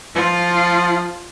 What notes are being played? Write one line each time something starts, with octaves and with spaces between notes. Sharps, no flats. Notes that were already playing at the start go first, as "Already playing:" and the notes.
F3 F4